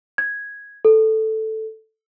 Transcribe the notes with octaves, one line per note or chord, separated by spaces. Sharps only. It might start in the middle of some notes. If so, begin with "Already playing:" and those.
G#6
A4